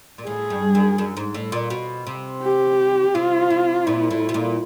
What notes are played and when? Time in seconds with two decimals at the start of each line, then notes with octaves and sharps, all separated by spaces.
0.18 A#2
0.27 A2 G#4
0.50 G2
0.75 F#2
0.98 F#2
1.17 G#2
1.34 A2
1.52 A#2
1.70 B2
2.07 C3
2.43 G4
3.15 C3 F4
3.50 C3
3.86 A#2 E4
4.11 A2
4.29 B2
4.34 A#2